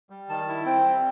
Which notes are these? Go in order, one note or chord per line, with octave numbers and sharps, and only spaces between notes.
G3
D#3 A5
E4
C4 G5
G3